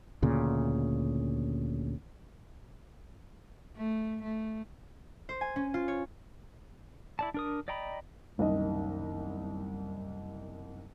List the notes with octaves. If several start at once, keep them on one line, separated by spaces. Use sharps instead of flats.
D2 A#2 C#3
A3
A3
C5
G#5
C#4
F4
C#5
E4 D5 A5
D4 A#4 D#6
D5 D#5 G5 A#5 B5
F#1 C2 D#3 D#5